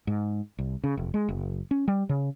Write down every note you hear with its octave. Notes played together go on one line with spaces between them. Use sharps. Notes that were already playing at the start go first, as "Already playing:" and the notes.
G#2
C2
C#3
F1
G#3
F#1
C#4
G3
C#3